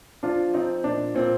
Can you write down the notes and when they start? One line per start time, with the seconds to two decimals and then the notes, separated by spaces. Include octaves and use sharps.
0.23 F3 D4 F4
0.53 F3 C4 D#4
0.84 A#2 D4
1.15 A#2 C4